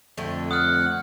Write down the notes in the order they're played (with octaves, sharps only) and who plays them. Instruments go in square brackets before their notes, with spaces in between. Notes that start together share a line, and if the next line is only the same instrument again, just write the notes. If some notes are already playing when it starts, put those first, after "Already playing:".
[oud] F2 D3 A3
[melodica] F#5 [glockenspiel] D#6 F6